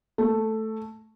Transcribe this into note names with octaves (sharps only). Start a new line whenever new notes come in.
A3